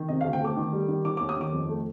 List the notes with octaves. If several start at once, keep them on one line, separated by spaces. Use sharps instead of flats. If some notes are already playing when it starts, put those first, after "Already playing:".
Already playing: D#3
C3 D#5
D2 F5
G5
A3 D6
D#3
G3
D#3
D#3 D6
D#2 D6
D#6
D#3 D6
F2
A3